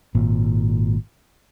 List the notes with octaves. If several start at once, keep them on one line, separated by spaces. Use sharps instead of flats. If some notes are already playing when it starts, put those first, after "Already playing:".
G#1 A#2